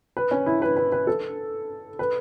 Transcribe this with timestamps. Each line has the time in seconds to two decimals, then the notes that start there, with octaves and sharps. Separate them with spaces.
0.17 B4
0.31 C#4
0.46 E4
0.62 B4
0.77 B4
0.92 B4
1.07 A4
1.99 B4